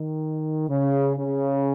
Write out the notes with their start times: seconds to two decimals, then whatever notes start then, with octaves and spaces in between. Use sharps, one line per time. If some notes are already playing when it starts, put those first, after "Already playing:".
Already playing: D#3
0.68 C#3
1.16 C#3